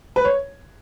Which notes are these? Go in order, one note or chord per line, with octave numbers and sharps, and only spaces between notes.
B4
C#5